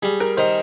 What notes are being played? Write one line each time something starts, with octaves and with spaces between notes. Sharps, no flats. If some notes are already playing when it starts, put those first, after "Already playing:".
G3 G#4
A#4
D#3 C5